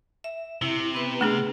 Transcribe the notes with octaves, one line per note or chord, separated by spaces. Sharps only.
E5
C3 E4
B3 B4
A3 D4 G#4